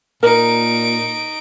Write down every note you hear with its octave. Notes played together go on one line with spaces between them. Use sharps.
A#2 D#4 A#4 D7